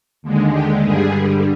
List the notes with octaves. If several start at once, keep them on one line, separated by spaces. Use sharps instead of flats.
D#2 D3 G#3
G4
G2 D3 G3 G#4